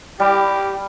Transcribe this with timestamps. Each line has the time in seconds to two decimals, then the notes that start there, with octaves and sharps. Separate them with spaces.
0.20 G3 G4